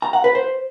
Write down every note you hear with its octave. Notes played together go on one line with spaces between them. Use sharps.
A#5
F#5
B4
C5